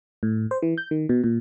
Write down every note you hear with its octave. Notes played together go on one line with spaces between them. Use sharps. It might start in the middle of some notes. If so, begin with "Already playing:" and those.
A2
C5
E3
G6
D#3
B2
A#2